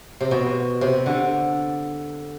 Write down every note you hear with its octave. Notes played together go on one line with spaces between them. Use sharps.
C3
B2
C3
D3